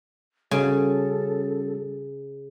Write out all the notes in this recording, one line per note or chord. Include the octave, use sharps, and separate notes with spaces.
C#3 G3 C#4 F#4 A4